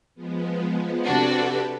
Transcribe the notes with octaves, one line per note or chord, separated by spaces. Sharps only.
F3 G#3 B3
C3 D4 F#4 G4 A4 B4